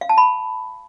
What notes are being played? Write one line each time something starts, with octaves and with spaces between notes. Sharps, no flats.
F5
A5
B5